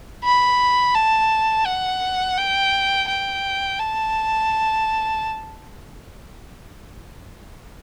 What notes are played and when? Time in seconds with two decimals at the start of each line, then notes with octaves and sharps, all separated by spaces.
0.24 B5
0.95 A5
1.66 F#5
2.37 G5
3.08 G5
3.79 A5